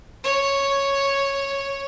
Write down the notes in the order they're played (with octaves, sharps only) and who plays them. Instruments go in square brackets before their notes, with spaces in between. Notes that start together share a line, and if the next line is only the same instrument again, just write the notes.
[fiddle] C#5